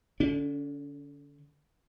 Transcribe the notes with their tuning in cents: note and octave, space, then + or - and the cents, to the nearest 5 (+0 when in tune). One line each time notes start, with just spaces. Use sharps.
D3 -10 C#4 +45